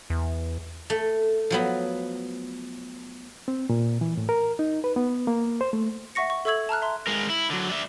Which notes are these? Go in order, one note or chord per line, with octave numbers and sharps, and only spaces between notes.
E2
A3
F3 F#3 B3
C4
A#2
E3
A2
A#4
D#4
B4
B3
A#3
C5
A3
E5 F#5 C#6 A#6 C#7
C#6
A4 E5 C#6 E6 G#6 F#7
A5 A#5 F6 F#6
E5 A#5 C6
G#3 A#4
E4
D3 F#3
D4 E5